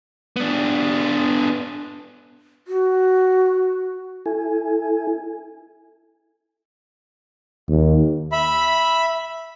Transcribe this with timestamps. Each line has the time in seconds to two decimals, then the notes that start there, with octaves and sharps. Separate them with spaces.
0.36 B3 D4
2.68 F#4
4.26 E4 A4 G#5
7.69 D#2
8.32 E5 B5